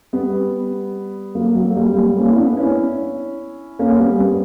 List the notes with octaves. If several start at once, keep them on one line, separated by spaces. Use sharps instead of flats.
G3 B3
F#3 A#3
F#3
A#3
G3
A#3
G3 B3
A#3 C#4
E4
B3 D4
C#4 E4
A#3 C#4
G3 B3
G3 B3